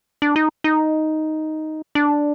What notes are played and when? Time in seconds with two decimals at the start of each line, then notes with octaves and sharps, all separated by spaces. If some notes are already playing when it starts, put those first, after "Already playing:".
0.22 D4
0.36 D#4
0.64 D#4
1.95 D4